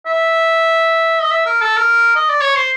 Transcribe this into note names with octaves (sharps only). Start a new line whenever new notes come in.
E5
D#5
E5
A#4
A4
A#4
D#5
D5
C#5
C5